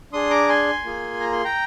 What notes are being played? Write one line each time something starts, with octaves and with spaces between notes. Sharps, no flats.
D4 G#4 C6 D#6
A#5 D6
G#5 C6
A#3 F4 G#4
A#5
C6
G5 A#5